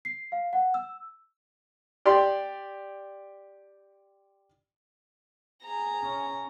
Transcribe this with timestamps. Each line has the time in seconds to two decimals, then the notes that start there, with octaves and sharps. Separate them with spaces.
0.05 C7
0.32 F5
0.53 F#5
0.74 E6
2.05 G4 D5 C6
5.64 G#4 G#5 A#5
6.02 C#4